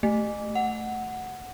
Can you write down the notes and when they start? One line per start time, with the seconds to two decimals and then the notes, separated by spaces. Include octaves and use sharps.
0.03 A3
0.55 F#5